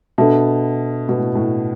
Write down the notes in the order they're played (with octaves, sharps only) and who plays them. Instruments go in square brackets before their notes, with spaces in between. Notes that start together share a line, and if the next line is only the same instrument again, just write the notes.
[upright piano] B2 [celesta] D4 A4 E5 A5
[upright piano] B2
A2
A2